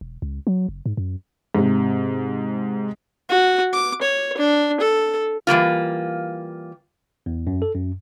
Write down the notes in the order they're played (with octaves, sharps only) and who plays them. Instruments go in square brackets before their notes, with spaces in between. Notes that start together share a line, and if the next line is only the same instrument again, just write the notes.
[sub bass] E1
C#2
F#3
F#1
G#2
F#2
[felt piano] G#2 C3
[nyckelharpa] F#4
D6
C#5
D4
A4
[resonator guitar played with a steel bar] E3 G3 A#3 F4
[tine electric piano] E2
F#2
A4
F#2